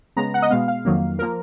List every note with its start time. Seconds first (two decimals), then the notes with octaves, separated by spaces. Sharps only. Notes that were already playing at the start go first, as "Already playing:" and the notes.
0.17 C#3 G#3 B3 A#5
0.34 F#5
0.42 D#5
0.51 B2 G#3 B3 F5
0.68 F5
0.85 F2 D#3 F#3 A#3
1.19 F3 A#3 A#4